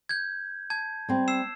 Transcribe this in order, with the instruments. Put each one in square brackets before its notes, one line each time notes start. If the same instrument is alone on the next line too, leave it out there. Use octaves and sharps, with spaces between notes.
[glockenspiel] G6 G#6
A5 G#6
[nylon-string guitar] G3 C4
[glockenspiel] E6 C7 E7